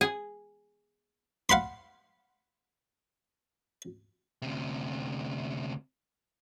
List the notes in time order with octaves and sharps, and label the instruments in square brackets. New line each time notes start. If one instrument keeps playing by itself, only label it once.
[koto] G#4
[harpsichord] F5 F#5 B5 C6
[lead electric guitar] D2 C3